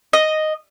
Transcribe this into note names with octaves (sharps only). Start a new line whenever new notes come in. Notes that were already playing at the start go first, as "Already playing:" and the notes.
D#5